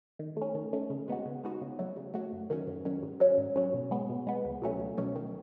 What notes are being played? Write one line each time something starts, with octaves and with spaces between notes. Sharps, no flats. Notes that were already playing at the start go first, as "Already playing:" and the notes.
D#3
A3 C#4
D#3
A3 C#4
C#3
G#3 B3 D#4 F#4
C#3
G#3 B3 D#4 F#4
C#3
F#3 A3
C#3
F#3 A3
F#2
D#3 F#3 C#4
F#2
D#3 F#3 C#4
G#2
F#3 C#4
G#2
F#3 C#4
B2
G#3 B3
B2
G#3 B3
C#2
B2 F#3 A3 C#4
C#2
B2 F#3 A3 C#4
D#3